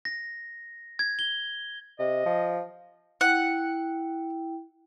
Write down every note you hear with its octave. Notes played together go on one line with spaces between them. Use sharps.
A#6
G#6
G7
C3 D#5
F3
E4 F#5 G5